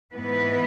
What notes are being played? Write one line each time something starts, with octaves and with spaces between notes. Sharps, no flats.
G#2 E3 B3 B4